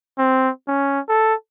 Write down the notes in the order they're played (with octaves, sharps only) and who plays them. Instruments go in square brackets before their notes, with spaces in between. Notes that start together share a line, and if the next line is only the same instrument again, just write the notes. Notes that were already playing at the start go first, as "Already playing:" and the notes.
[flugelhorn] C4
C#4
A4